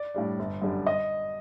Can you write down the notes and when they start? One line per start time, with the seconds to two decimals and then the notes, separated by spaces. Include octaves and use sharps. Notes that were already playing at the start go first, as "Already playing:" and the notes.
Already playing: D5
0.14 A2 G3 D4
0.39 G1
0.62 F#2 D3 G3
0.87 D#5